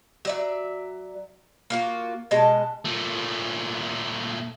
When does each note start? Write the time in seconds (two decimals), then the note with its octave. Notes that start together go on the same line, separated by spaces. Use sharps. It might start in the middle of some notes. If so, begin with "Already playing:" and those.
0.25 F#3 D5 E5
1.70 A#3 F4 F#4
2.31 B2 G#3 D#5 A5
2.85 A#2 A3